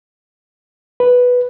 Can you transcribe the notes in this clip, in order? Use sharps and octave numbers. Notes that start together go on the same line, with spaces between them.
B4